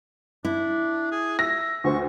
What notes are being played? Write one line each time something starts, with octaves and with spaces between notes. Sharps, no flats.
D4 E4
G#4
E5 A#6
D2 C5 C#6